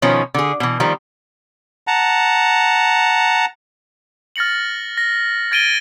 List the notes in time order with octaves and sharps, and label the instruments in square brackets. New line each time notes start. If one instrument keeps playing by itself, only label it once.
[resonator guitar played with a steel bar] B2 D#3 F3 C#4
D3 G#4
B2 E3
D#3 F3 G3
[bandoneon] F#5 A5 A#5
[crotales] F6 A6 A#6 C#7 F#7
A#6
G#6 A6 D7 D#7 G7